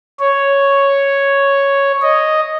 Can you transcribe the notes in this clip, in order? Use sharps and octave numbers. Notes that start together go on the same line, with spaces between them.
C#5
D#5